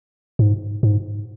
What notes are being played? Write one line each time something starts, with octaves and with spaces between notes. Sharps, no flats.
G#2
G#2